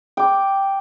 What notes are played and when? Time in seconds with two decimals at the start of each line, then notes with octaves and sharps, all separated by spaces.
0.17 G5 D6